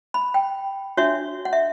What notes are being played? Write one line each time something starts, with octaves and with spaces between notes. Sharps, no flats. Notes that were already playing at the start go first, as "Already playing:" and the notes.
B5
G5
D4 F#4 C#5 E5
F#5
E5